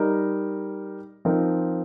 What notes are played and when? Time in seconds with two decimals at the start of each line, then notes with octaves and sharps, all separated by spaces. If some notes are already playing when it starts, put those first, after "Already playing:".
Already playing: G3 D#4 A#4
1.25 F3 C4 D#4 A#4